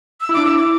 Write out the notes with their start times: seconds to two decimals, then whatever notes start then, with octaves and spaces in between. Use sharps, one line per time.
0.21 E6
0.29 E4
0.33 D4 D6
0.45 E4 E6
0.57 D6